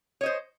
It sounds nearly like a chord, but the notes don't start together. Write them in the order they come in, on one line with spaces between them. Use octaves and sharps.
C#5 D#5 C5